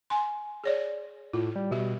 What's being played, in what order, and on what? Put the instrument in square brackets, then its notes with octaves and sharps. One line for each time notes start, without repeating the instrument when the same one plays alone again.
[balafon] G#5 C6
G#4 C#5 D5
[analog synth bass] A2 [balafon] F4
[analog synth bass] G3
[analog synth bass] B2 [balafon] G3 G4